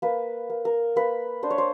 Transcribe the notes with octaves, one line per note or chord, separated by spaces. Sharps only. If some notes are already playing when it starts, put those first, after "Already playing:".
A#3 B4
A#3
A#4
A#3 B4
D4 C5
C#5
C5